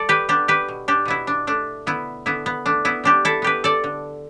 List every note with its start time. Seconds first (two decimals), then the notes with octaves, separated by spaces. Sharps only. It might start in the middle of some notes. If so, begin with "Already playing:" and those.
Already playing: G3 A4 D5
0.09 G4 B4
0.29 B3 D4 G4
0.48 G4 B4
0.68 B2
0.88 D4 G4
1.05 B2 B3 E4
1.27 D4
1.47 A3 D4
1.87 D3 B3 E4
2.26 D3 B3 E4
2.46 B3
2.66 A3 D4
2.85 B3 E4
3.04 G3 D4 G4
3.25 E4 A4
3.42 B3 G4 B4
3.64 A4 D5
3.84 D3